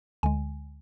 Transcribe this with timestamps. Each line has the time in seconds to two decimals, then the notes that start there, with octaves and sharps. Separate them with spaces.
0.23 D2 D3 G#3 G#5